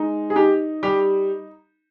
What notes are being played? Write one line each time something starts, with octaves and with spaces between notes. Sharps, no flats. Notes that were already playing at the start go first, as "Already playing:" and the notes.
Already playing: G#3 D#4
G#4
D#4 G4
G3 G4